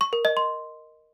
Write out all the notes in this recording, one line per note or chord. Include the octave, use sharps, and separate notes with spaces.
C#6
A#4
D#5
C6